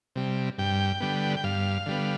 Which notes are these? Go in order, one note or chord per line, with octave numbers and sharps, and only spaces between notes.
C3 G3
G2 G5
D3 G3 B3
G5
G2 F5
D3 G3 B3